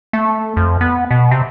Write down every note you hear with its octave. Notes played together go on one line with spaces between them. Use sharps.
A3
F2
B3
B2
C3